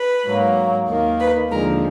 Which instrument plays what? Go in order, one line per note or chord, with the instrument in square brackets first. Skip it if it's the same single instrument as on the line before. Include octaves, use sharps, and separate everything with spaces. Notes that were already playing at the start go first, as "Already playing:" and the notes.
Already playing: [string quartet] B4
G#2 F#3 A#3
D#2 D#3 A#3
B4
D#2 D3 F3 G#3 A#4